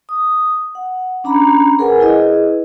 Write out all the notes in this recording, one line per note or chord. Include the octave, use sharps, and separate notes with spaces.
D#6
F#5
C#4 D4 A#5 B5
G#4 A#4 B4 C#5 F#5 G#5
E4 G#4 B4 D#5